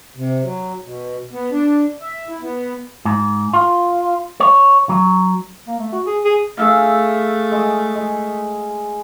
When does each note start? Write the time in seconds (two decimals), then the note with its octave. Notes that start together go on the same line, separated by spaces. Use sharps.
0.17 C3
0.42 F#3
0.83 B2
1.32 B3
1.51 D4
2.01 E5
2.28 E4
2.41 B3
3.05 G#2
3.53 F4
4.40 C#5
4.89 F#3
5.67 A#3
5.79 A3
5.92 F#4
6.06 G#4
6.24 G#4
6.57 A3 G#4 E5 F5
7.52 G#3
7.95 G#3